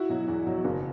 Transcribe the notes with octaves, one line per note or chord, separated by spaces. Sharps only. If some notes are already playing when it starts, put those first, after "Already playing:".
Already playing: E4 F#4
B2 F#3
E2
B2 F#3
F#1